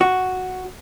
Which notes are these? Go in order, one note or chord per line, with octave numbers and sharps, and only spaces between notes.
F#4